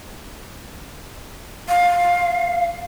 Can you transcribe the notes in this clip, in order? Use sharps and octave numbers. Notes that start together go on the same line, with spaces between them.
F5